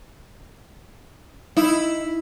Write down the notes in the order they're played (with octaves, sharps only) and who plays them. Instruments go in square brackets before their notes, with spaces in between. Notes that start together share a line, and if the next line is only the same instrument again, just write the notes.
[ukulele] D#4 [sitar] E4